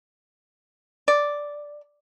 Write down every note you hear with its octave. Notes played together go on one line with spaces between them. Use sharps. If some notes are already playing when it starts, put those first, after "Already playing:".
D5